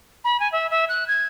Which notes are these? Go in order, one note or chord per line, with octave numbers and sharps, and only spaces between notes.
B5
G#5
E5
E5
F#6
G#6